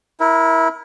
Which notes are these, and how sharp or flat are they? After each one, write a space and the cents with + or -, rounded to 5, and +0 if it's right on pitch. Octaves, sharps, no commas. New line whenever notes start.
E4 -10 A#4 +20